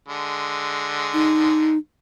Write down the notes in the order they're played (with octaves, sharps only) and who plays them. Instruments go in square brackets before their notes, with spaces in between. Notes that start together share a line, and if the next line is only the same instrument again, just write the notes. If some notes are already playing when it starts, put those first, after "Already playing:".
[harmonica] D3 G#3
[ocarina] D#4